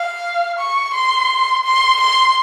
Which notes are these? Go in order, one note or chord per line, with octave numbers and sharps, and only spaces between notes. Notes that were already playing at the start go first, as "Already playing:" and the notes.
Already playing: F5
C#6
C6
C6
C6